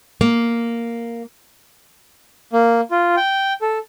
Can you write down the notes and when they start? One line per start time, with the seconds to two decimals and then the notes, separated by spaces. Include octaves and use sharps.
0.21 A#3
2.53 A#3
2.91 F4
3.17 G5
3.62 A4